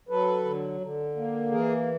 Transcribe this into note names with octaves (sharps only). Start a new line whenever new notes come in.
F#3 A4 B4
D3
D3
A#3
E3 G#4 A#4